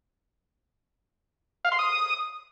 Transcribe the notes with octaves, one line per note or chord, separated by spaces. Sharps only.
F5
C6
D#6